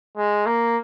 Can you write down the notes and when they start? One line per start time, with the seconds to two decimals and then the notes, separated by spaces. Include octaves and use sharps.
0.17 G#3
0.46 A#3